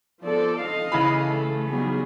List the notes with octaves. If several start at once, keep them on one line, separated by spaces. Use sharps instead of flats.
F3 B3 A4 D5
D#5 F5
C#3 E3 A3 B5
A4
F#3 G3 B3 D#4 G#4